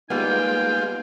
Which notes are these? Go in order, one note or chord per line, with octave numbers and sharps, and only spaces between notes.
G3 G#3 A#3 B3 D#4 F4 G5